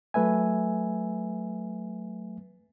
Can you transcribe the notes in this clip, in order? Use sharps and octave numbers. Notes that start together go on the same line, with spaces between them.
F#3 A3 B4 E5 G#5